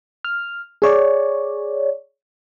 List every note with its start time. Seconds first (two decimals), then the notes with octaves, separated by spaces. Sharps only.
0.25 F6
0.82 G#4 C#5 D5